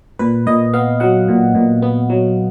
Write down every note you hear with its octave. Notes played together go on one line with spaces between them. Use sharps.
A#2 B4
A#2 D#5
B3 F5
F#3 F#5
A#2
A#2
B3
F#3